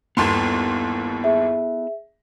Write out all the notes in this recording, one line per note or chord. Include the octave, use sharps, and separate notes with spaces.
G1 D#2 B3 E4 A4 C6
G#4 E5